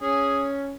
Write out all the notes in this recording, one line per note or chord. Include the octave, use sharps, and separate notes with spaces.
C#4 G#4